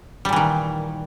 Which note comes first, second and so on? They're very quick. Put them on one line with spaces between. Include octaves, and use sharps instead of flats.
G3 A#2 E3 D#3